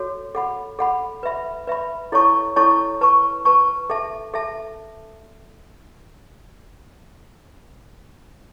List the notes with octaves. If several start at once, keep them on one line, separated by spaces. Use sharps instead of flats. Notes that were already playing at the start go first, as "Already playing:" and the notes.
Already playing: F#4 A4 C#5
A4 F#5 B5
A4 F#5 B5
B4 E5 B5
B4 E5 B5
E4 A4 C#5 A5 C#6
E4 A4 C#5 A5 C#6
B4 A5 C#6
B4 A5 C#6
A4 E5 A5
A4 E5 A5